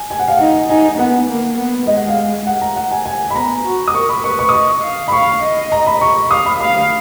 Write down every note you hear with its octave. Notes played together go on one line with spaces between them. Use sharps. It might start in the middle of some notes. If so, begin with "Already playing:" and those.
Already playing: G#5
G#5
F#5
F5
D#4 F#5
D#4 G#5
B3 F#5
A#3
B3
G#3 D#5
F#5
F5
F#5
A#5
F#5
G#5
G#5
B5
B3 A#5
F#4
D#6
A#4 C#6
B5
B4 C#6
C#6
D#6
D#5 C#6
F5
B5
F5 C#6
D#5
A#5
B5
C#6
F5 D#6
B5
F5 B5